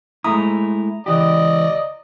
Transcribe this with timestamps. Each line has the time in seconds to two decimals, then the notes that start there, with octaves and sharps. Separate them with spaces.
0.24 G#3 A3 E4 A#5 D#6
1.06 C#2 E3 G4 D5 D#5